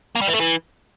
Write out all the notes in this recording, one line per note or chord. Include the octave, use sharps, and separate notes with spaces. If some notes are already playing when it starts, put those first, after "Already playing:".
A#3
G3
E3
A3
E3